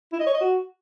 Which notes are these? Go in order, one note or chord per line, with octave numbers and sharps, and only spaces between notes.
E4
D#5
C#5
D#5
F#4